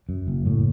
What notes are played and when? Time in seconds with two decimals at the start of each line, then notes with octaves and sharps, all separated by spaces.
0.09 F#2
0.28 F#1
0.46 A2